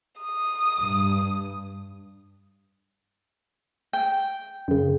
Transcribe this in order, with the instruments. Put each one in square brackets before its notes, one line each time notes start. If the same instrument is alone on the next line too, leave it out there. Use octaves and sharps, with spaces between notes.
[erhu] D#6
[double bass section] G2
[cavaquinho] G5
[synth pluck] F#2 C#3